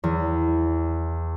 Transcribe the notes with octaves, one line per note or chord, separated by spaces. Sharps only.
E2